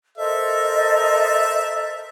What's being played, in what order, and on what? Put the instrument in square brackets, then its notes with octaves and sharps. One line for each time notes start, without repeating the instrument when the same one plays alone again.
[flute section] A4 C5 D#5 [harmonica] A#4 E5